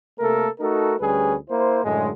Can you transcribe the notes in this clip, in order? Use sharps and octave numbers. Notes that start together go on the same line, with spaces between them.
C3 A3 A#3 A4 A#4
A3 D#4 F#4 A4 A#4
D2 G3 C#4 G#4 B4
A#3 E4 C5
F#2 A2 D3 G#3